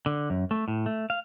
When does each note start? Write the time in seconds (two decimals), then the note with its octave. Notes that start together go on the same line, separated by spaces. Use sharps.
0.06 D3
0.30 F#2
0.51 A3
0.68 A2
0.86 A3
1.10 F5